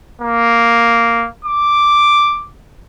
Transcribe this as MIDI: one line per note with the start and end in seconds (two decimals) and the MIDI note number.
0.22 1.26 58
1.45 2.47 86